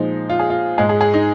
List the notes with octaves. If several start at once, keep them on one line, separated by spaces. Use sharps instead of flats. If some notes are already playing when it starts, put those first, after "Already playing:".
Already playing: A#2 F3 G#3 D#4
F4
G#4
F4
G#2 G#3 G#4
G#4
G#4
D#4